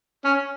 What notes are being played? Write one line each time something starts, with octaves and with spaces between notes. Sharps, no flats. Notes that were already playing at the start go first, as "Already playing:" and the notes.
C#4